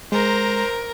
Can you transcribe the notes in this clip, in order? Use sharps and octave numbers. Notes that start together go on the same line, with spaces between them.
G#3 A#4 C5 A#5